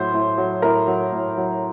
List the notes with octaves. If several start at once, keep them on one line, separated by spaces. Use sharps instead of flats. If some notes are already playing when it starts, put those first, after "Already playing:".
Already playing: A2 F#3 C5
A2
F#3
A2 A#4
F#3
A2
F#3